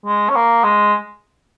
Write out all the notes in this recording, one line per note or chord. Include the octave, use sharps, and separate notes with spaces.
G#3
C#4
A#3
G#3